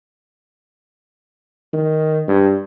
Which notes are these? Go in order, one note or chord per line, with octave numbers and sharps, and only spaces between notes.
D#3
G2